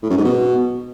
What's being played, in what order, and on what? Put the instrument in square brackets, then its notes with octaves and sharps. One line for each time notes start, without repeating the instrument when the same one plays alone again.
[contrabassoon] A2
F#2
G#2
B2